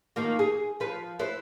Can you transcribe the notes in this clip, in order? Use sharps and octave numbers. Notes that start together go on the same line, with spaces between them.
D#3 F3 A#3
G#4
F3 B4
E4 B4 C5